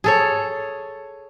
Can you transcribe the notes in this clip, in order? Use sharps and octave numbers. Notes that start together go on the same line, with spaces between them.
G#4 A4 C#5